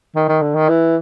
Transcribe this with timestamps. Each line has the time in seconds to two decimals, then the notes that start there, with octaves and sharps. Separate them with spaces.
0.16 D#3
0.28 D#3
0.42 D3
0.55 D#3
0.69 E3